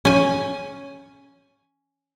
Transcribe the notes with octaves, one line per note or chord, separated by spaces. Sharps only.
C#4 G#5